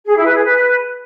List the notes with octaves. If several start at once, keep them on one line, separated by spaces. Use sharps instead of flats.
G#4
E4
B4
G#4
B4